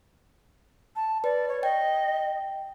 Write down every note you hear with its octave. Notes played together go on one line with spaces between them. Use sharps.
A5
B4 D5
C#5
D#5 G5